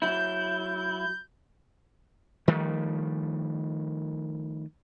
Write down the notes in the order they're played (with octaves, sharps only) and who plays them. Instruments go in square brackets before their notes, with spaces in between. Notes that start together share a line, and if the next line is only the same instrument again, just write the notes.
[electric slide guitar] F#3 E4 [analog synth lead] G6
[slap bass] D#3 F3 G3 A3